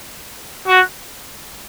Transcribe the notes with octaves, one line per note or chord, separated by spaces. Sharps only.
F#4